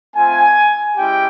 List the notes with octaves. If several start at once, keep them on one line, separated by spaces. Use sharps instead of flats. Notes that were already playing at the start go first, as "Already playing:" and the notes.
A3 C4 F4 G#5
G#3 C#4 E4 G4 G5